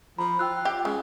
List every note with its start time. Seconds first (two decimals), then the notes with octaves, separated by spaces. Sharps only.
0.18 F3 A#5 B5
0.39 F4 G5 E6 F#6
0.65 G4
0.85 C#3 G#3